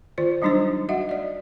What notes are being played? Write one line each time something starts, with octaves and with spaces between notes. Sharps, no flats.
D#3 F4 C5 D5
F#3 G3 D4 D#4 G4 C5
F#4 D#5 E5 F#5
D5 D#5